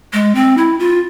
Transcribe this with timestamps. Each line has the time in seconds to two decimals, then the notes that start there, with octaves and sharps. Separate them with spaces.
0.13 G#3
0.35 C4
0.58 E4
0.79 F4